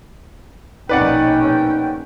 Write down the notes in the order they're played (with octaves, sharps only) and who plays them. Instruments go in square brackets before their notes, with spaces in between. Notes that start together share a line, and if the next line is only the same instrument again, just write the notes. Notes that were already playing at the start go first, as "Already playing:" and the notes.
[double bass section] A#1 B2 C#4 [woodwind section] D#4 G5 [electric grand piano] B4 D5 F#5